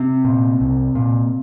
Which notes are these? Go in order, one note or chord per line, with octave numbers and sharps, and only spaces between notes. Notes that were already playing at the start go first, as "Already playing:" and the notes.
Already playing: C3 C4
A#2
C2
A#2